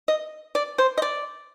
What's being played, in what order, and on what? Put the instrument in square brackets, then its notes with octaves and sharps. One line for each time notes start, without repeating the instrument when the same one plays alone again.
[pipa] D#5
D5
C5
D#5
D5